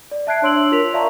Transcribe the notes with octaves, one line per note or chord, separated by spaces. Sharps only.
D5
E5 A5 F#6 G#6 C7 D7
D4 C#5 C6 E6 D7 F#7
F4 A#4 B6 F7
D5 E5 F5 A5 A#5 C#6